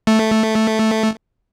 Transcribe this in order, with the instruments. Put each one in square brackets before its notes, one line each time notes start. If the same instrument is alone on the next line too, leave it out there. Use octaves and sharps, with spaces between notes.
[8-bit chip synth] A3